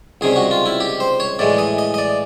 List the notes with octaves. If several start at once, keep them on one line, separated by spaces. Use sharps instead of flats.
C#2 C3 D#3 G3 G#4
F#4
F4
E4
G4
C5
C#5
A2 E3 G#3 D5
D#5
D#5
D#5
D5